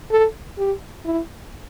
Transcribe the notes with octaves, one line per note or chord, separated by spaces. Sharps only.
A4
G4
E4